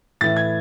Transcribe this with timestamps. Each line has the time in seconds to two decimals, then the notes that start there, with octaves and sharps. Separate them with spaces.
0.21 A2 E3 A6
0.36 G#6